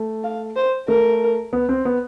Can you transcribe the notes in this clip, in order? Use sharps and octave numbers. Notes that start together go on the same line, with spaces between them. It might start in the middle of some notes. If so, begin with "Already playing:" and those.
Already playing: A3
F5
C5
A3 A#4
B3
C4
B3